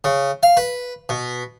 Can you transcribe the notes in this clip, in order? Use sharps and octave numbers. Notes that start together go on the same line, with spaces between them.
C#3
F5
B4
B2